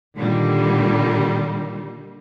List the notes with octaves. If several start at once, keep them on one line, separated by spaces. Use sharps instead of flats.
A#2 D3 D#3 G3